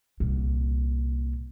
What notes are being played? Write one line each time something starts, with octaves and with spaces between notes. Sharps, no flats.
C2 A#2